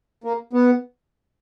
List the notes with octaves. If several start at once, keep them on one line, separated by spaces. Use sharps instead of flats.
A#3
B3